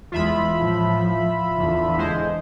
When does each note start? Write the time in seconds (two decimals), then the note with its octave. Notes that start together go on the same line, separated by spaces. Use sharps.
0.12 E2 G#3 F4 E5 B5
0.56 A2 F3
1.55 E2 D3
1.98 G#3 C5